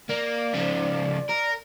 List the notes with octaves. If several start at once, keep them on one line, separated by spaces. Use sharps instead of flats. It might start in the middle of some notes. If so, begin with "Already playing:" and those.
A#3 D5
C#3 F3
A#4